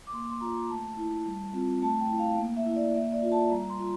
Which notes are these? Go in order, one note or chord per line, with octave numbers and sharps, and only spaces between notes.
D6
A#3 C6
C6
F4 A#5
A3 A5
E4
G3
C4 F4
A3 A5
G5
E4
F5
A#3
E5
E4
D5
A#3 E5
D5
F4
A5
G3 A#5
C6
F4